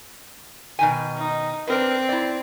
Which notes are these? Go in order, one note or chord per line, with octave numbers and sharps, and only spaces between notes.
B2 D#3 G#5
D#4
C4 D4 A#4 B4
E4 D5